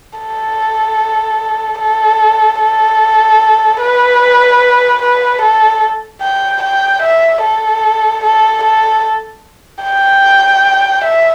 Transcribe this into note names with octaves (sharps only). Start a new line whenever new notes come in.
A4
A4
A4
B4
B4
A4
G5
G5
E5
A4
A4
A4
G5
E5